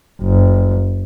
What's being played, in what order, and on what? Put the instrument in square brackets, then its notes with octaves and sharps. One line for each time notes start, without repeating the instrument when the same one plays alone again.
[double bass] F#1